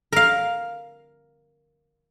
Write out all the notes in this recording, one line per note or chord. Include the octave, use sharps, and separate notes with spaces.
A#4 F5